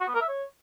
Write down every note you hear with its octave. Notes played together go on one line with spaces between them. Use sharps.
F#4
B3
A#4
E5
C#5